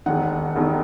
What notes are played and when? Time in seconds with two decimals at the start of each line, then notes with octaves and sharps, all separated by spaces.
0.06 E1 D#2 D#3 F#5
0.56 E1 D#2 D#3